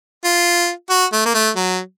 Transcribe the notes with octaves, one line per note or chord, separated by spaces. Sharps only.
F4
F#4
A3
A#3
A3
F#3